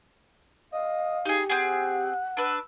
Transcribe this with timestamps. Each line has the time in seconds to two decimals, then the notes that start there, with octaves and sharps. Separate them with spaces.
0.72 D#5 F5
1.25 D#4 G4 G#4
1.50 C4 G#4 F#5
2.37 D4 B4 E6